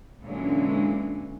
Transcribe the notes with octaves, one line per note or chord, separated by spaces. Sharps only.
A#2 D3 E3 F#3 G#3 C#4